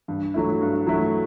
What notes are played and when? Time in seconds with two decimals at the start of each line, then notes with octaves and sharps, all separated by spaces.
0.08 G2
0.34 F#3 A3 E4
0.61 G2
0.87 F#3 A3 E4